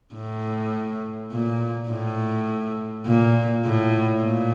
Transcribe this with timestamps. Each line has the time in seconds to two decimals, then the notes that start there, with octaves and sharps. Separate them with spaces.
0.15 A2
1.32 A#2
1.89 A2
3.06 A#2
3.65 A2
4.22 A#2